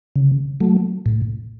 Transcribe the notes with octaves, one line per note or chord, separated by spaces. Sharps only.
C#3
F#3 A3
A2